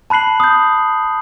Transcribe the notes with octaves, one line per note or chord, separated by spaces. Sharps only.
A5 B5 F#6 C7 F#7
D#6 G6